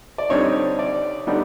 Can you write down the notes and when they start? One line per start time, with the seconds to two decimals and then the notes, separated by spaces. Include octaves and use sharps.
0.18 D5
0.30 D3 G3 C4 D#4 C#5
0.79 D5
1.27 D3 G3 B3 D#4